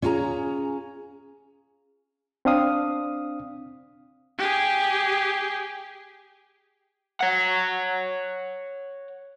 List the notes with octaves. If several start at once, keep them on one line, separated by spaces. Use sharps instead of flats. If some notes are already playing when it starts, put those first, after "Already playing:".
C#4 E4 F4 G#4 A#5
C4 D4 F5 D#6
G4 G#4
C#5 F#5